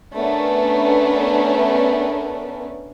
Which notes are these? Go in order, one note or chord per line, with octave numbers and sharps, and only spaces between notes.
A3 B3 C#4 D4 A#4 B4